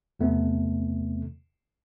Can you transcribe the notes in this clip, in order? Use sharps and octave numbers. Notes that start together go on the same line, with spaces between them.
E2 C3 A3 B3